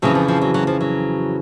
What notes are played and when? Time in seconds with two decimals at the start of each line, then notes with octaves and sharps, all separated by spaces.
0.02 F2 C#3 E3 F#3
0.15 F3
0.28 F3
0.41 F#3
0.54 F#3
0.67 F3
0.81 F#3